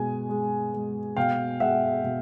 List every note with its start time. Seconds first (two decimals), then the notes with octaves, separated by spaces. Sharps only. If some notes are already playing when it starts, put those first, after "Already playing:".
Already playing: B2 G#3 G#5
0.30 G#3
0.74 G#3
1.17 B2 F5 G5
1.60 G#3 E5 F#5
2.04 B2